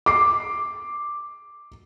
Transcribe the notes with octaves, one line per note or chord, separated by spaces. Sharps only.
D6 C7